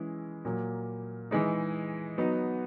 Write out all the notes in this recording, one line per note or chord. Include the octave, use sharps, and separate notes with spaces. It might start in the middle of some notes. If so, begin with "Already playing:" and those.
Already playing: E3 G#3 C#4 E4
A#2 F#3 A#3
E3 G#3 D#4
F#3 B3 D#4